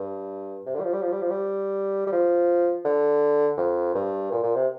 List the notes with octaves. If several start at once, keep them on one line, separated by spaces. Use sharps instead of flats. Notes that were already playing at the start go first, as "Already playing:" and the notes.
Already playing: G2
C3
D3
G3
F3
G3
F3
G3
F3
G3
G3
F3
D3
F2
G2
A#2
A#2
C3